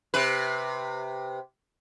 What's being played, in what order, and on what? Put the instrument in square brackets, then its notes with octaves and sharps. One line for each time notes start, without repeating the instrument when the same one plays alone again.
[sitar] C3 B4